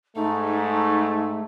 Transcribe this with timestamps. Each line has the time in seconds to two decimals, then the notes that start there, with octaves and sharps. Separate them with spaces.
0.15 G#2 A3 D#4